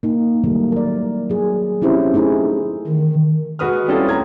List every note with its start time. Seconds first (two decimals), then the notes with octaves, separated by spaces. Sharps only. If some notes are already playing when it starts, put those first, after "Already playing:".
0.03 A#3 D#4
0.44 D#3 F#3 G3 A3 A#3
0.72 A#4 D5
1.30 F#3 G#4
1.82 C4 C#4 E4 G4 C5
2.14 A3 D#4 E4 G#4
2.87 D#3
3.59 G#3 F#4 B4 D#6 F6
3.88 G3 C4 C#4 E4 F4 A4
4.09 A3 A#5 G#6